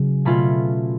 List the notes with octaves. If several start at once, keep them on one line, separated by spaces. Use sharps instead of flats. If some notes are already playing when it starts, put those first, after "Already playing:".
Already playing: C#3 F#3 C#4
B2 A3 C#4 F4 B5